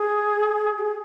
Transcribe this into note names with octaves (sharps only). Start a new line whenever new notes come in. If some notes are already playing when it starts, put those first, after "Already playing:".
Already playing: G#4
G4
G#4